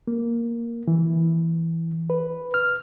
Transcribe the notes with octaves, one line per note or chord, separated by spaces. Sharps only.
A#3
E3
B4
F6